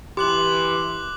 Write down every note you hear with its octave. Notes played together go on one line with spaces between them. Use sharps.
E3 G4 C6 D6 F#6 F#7